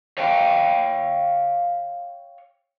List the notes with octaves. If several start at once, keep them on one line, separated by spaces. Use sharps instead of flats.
C#5 F5 G5